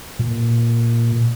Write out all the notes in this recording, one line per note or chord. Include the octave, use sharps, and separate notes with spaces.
A#2